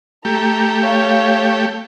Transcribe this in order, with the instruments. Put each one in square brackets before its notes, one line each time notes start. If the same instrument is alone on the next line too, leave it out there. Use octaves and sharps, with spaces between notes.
[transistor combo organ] A3 G4 [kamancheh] A#5
[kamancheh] C#5 F5